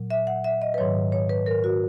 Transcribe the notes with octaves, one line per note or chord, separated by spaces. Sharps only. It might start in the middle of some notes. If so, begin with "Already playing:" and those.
Already playing: A#2 F#3
E5
F#5
E5
D#5
B4
G#2 D#3 F#3 C#5
C#5
B4
A#4
F#4